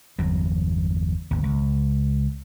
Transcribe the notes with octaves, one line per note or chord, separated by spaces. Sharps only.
G1 E2 F#3
G#1 D#2
C#2